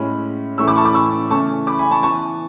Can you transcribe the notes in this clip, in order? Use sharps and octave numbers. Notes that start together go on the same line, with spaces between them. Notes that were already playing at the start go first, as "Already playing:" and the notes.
Already playing: A2 G#3 C#4 B5
A2 E3 A3 C#4 C#6 E6
B5 D6
A5 C#6
B5 D6
C#6 E6
C#3 E3 A3 C#4 A5 C#6
B5 D6
G#5 B5
A5 C#6
E3 B3 A5 C#6